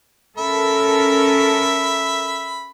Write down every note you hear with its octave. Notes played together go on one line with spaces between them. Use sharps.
C#4 A4 A#4 E5 B5